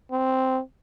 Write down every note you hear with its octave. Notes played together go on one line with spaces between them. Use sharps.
C4